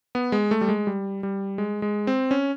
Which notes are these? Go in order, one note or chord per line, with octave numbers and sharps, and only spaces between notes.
B3
G#3
A3
G3
G#3
G3
G3
G#3
G#3
C4
C#4